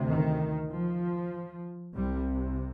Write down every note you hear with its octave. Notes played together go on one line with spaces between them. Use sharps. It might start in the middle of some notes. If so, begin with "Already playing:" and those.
Already playing: D2 C3
D#3
F3
C2 C3 G3